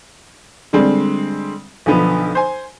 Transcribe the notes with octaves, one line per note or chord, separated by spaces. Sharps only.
D3 G3 G#3 C4
B1 D3 F3 B3
C5 G#5